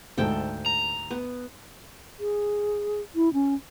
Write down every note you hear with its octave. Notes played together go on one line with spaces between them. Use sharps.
D2 G#2 A4 G5
A#5
B3
G#4
E4
C#4